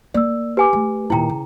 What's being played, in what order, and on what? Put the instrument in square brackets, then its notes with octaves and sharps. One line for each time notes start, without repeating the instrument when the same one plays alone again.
[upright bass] A#3 [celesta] D5 E6
[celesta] G4 [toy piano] B4 G#5 D6
[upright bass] A3
[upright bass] D#2 A#2 [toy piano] E4 G5 A#5
[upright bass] C#3